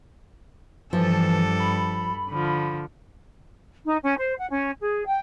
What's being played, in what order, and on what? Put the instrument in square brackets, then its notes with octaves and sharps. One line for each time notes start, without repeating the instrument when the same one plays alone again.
[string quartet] G2 A4 [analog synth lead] E3 [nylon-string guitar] F3
[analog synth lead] B5
[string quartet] D3 F3
[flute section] D#4
C#4
C5
F#5
C#4
G#4
G5